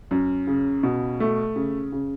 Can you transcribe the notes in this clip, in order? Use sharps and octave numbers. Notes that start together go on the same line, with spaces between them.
F#2
C#3
B2
A3
C#3
C#3